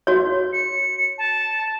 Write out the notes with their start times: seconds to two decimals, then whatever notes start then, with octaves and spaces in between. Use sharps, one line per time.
0.07 F#4 C#5
0.53 C#7
1.18 A5